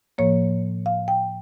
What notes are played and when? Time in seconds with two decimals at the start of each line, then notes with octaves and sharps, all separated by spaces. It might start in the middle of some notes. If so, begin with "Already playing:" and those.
0.18 A2 F3 A#3 C#5
0.86 F5
1.08 G5